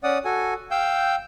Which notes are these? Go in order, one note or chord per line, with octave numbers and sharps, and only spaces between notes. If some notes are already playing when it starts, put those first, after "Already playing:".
C#4 D5 F#5 D#6
F#4 A4 G#5
F5 G5 E6 G6